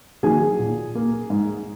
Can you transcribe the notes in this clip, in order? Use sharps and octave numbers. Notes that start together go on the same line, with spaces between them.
D#3 F#3 A#3 G#4 G#5
A#2
A#3
G#2